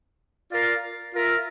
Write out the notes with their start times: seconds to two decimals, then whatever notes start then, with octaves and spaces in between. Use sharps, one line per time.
0.52 F4 A#4 D5 F5
1.14 F4 A#4 E5